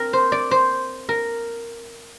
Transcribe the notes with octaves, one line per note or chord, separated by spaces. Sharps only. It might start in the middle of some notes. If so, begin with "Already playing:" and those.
Already playing: C4 A#4
C5
D5
C5
A#4